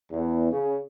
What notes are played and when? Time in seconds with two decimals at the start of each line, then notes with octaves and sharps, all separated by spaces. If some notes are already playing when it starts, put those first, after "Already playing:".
0.12 E2
0.52 C#3